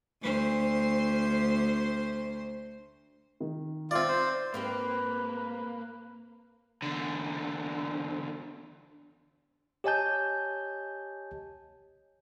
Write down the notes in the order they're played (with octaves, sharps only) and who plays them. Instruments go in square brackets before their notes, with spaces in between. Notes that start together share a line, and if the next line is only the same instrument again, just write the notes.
[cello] D2 C5
[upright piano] D#3
[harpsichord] C4 D5 [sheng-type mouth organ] F4 [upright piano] E5
[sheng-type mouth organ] C5
[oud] G#2 C4 G4 [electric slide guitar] A#3 [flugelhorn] B4
[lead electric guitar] E2 D3
[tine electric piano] G4 C#5 D#5 G#5 A5 G6